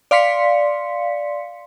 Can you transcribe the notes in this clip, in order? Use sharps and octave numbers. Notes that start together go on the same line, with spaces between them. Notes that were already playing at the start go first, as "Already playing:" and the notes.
D5 F5 C6 B6 C#7